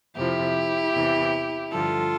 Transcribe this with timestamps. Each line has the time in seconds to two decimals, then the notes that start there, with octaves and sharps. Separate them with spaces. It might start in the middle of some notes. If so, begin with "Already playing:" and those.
0.15 F2 C3 F3 E4 G4
0.94 E2 C3 E3
1.71 G2 D3 F3 F4 A4